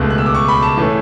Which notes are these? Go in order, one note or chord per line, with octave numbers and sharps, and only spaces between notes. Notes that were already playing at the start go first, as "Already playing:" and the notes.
Already playing: C#2 B2 A3 F#6
F#6
E6
D6
C#6
B5
A5
A2 E3 A3 C#4